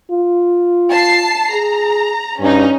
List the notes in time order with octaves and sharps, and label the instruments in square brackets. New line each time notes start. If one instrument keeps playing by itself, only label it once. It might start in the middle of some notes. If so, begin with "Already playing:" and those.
[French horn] F4
[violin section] A5 C7
[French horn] G#4 [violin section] A#5
[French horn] G2 [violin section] C#4 D#4